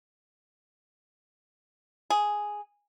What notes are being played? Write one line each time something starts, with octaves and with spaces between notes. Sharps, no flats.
G#4